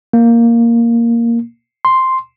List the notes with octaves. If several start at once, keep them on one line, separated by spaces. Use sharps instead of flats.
A#3
C6